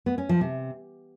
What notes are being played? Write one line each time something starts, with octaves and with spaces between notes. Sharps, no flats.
B3
C#4
F3
C3